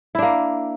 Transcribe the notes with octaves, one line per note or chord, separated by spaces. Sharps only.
A#3 D4 E4